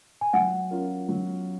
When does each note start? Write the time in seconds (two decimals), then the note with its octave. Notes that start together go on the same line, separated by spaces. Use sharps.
0.21 G#5
0.33 F#3 F#5
0.71 C#4 F4 A#4
1.09 F#3